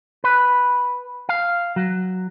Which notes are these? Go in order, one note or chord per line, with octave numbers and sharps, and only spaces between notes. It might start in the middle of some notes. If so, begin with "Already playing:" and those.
B4
F5
F#3